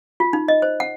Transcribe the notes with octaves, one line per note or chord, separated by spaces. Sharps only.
F4
D#4
D#5
C5
F#5